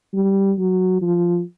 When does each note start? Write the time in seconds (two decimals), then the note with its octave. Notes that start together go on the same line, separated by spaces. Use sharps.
0.14 G3
0.58 F#3
1.02 F3